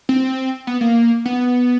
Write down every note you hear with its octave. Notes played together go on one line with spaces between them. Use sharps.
C4
B3
A#3
B3